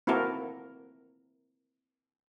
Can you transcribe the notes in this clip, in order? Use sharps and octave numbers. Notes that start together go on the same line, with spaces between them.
A#3 C4 E4 F#4 A4 A#4